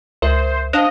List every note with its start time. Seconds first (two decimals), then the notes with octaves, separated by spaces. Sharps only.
0.22 C#2 A#4 C5 E5
0.73 D4 C5 D#5 F5